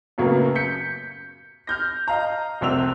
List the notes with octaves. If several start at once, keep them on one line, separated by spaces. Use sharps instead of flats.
F#2 A2 C#3 F#3 A#3 B3
G6 B6 C#7
F6 G6 A#6
D#5 F5 A#5
F1 C2 C4 E6 F#6 F7